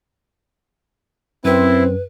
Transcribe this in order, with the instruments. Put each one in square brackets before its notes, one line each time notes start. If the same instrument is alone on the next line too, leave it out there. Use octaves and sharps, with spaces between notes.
[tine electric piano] F#2 [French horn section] C4 [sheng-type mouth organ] E4 [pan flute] B4